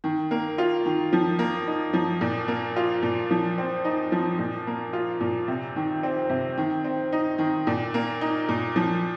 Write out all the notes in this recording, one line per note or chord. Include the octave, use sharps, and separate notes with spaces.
D#3
A#3
F4
D#3
F3
A#3
D#4
F3
A#2
A#3
F4
A#2
F3
C4
D#4
F3
A#2
A#3
F4
A#2
C3
D#3
C4
C3
D#3
C4
D#4
D#3
A#2
A#3
D#4
A#2
F3